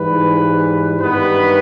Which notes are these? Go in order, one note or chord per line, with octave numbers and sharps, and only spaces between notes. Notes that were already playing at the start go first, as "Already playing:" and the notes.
Already playing: G#2 E3 G3 B4
G2 D#3 G3 B3 B4